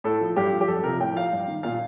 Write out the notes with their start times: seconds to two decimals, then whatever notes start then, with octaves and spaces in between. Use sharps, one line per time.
0.04 A2 A4
0.21 F3
0.36 G2 G4
0.53 F3
0.61 G4
0.68 F2 A4
0.84 C3 F3 A#4
1.00 A2 G5
1.15 F3 F5
1.33 G2
1.48 D#3
1.63 A#2 F5